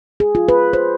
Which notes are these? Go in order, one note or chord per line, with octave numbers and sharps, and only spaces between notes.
G#4
F4
B4
C5